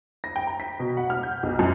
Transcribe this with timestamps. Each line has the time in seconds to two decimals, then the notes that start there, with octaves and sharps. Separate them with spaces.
0.24 A#6
0.36 G5
0.47 A#5
0.60 B6
0.79 B2
0.97 F#5
1.10 F6
1.23 G6
1.43 B1
1.59 F#2